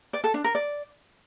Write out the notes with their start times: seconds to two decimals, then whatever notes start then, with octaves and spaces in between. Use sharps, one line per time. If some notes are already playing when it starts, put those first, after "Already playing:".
0.13 D5
0.24 A4
0.34 D4
0.44 A#4
0.55 D5